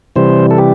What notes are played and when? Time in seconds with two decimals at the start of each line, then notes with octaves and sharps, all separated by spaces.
0.16 C3 E3 G3 C5
0.51 A4
0.58 G4